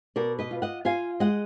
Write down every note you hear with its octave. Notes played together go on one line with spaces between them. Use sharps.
B2 A#4 D5
B4 D#5
F4
D#5 F#5
F4 F5 G#5
G#3 D#5 F#5